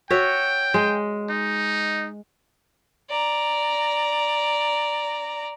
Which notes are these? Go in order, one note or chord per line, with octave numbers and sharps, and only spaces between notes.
F#4 C#5 E5 G5
G#3
D#4
D5 A#5